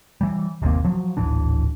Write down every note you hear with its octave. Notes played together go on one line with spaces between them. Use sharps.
E3 G3
G1 D#2 C3 A#3
F3 F#3
D1 G#1 E3 D4